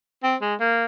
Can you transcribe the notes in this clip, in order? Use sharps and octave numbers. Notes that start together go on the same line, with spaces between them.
C4
G#3
A#3